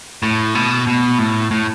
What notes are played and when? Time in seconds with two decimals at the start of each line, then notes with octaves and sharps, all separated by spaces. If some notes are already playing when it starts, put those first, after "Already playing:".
0.23 A2
0.55 B2
0.87 B2
1.19 A2
1.51 A2